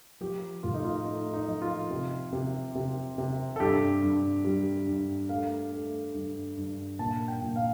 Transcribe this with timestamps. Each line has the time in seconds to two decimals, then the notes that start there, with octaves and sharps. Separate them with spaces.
0.21 F3 G4
0.63 A2 F4
0.74 D#4
0.84 F4
1.05 A3 D#4
1.34 D#4
1.48 F3
1.62 F4
1.90 C3
2.32 C3
2.75 C3
3.18 C3
3.56 A4
3.60 G2 G4
4.02 G2
4.44 G3
4.87 G2
5.29 A3 F5
5.72 A3
6.14 G2
6.57 G2
6.99 A#2 A5
7.28 G5
7.42 A#2
7.56 F5